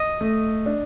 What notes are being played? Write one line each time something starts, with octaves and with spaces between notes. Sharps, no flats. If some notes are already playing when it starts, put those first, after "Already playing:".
Already playing: D#5
A3
D4